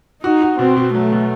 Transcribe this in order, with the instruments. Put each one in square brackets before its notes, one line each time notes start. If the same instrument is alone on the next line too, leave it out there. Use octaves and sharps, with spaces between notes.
[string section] D#4 [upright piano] F#4
[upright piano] F#4
[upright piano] B2 [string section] C4
[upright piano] B2
[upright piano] F#3 [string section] A3
[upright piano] B2